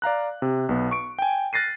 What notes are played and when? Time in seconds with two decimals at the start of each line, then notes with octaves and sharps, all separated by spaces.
0.02 D5 F5 A#5 F#6
0.42 C3
0.69 B1 B3
0.91 C#6 D7
1.19 G5 G#5
1.53 F6 F#6 A6 A#6 C7 D#7